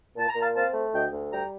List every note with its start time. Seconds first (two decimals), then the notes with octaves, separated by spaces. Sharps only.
0.16 A#2 A5
0.29 A#5
0.36 A#2 F5 A5
0.55 C4 F5 A5
0.74 A3
0.93 D2 D#5 G5
1.12 D2
1.31 G3 G5 A#5